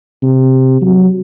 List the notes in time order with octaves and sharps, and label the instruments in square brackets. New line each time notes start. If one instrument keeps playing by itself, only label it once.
[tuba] C3
F#3